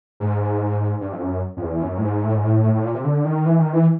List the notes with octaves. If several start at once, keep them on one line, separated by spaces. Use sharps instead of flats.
G#2
G2
F2
F#2
F2
E2
F#2
A2
G#2
A2
G#2
A2
A2
A2
A#2
C3
D3
D#3
E3
D#3
E3